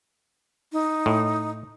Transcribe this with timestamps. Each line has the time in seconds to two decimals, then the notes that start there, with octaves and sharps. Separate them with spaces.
0.73 D#4
1.06 A2